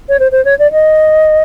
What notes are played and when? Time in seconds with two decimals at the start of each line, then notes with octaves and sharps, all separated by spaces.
0.09 C#5
0.20 C5
0.32 C5
0.45 C#5
0.59 D5
0.72 D#5